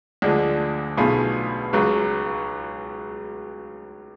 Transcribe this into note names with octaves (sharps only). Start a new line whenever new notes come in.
D2 D3 F3 G#3
B1 B2 A3 F4 G#4
C#2 C#3 F#3